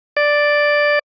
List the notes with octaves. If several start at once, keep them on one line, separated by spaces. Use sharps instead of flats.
D5